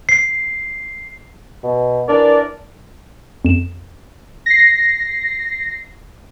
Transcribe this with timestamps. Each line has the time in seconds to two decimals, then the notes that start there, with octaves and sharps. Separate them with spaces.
0.09 C7
1.63 B2
2.09 E3 D4 A#4 D5
3.45 F2 E7
4.46 A#6 C7